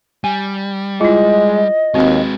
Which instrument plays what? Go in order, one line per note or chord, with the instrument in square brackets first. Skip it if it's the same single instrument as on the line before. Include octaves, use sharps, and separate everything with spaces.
[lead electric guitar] G3 [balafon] G#5
[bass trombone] G#3 [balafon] E4 F4 [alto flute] D#5
[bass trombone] D#2 [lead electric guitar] G#3 B4 [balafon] C4 F#4